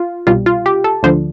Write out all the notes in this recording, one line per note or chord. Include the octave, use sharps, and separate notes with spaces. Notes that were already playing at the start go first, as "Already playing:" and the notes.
Already playing: F4
C2 B2 G3 F4
F4
G4
A4
D2 D3 F3 C5